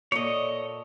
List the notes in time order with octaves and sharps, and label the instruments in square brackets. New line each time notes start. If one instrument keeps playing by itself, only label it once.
[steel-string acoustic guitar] A#2 A4 [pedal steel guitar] C#5 D#5